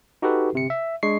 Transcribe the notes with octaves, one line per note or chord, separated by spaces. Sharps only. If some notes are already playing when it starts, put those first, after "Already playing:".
D#4 F#4 G4 A4 B4
G1 C3 C#7
E5
G#3 D4 C#6 C7